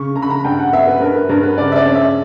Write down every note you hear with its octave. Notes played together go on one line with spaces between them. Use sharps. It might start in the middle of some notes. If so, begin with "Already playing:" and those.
Already playing: C#3 C#6
C#3 A#5
B5
A#5
G2 G5
F#5
B3 E5
B4
G2 A#4
B4
G2 A#4
B4
C#3 D5
E5
D5
C#4
E5